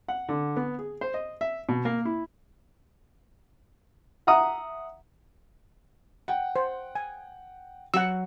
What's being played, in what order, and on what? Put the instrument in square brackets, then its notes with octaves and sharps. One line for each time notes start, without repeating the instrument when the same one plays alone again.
[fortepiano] F#5
D3
B3
G#4
C5
D#5
E5
B2
A#3
E4
E5 F#5 A#5 D#6
[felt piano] F#5 G5
[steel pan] C5
G#5
[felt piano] F#3 [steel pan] F#5 E6